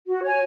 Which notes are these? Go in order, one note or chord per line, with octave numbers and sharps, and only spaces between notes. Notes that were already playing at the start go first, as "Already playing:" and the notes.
F#4
C#5 G#5